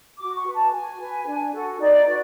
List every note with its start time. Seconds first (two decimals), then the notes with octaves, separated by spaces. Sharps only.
0.19 F#4 D6
0.37 C#6
0.45 B4
0.54 A5
0.72 F#4 G#5
0.99 B4
1.26 D4
1.53 F#4 A4
1.79 D#4 D5
2.06 F#4 B4